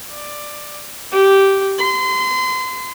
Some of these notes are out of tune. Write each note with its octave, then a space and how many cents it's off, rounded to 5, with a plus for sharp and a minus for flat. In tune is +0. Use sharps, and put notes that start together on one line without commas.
D5 +10
G4 -10
C6 -35